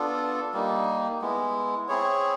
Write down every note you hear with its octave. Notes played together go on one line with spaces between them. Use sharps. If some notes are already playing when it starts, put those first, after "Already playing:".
Already playing: B3 D4 F4 A4
G3 A#3 D#4
G#3 B3 E4
C4 E4 G#4 C#5